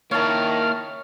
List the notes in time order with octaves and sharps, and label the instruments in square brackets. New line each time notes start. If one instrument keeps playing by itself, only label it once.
[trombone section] D#3 [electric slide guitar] A#3 E4 [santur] C#5 A5 [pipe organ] F6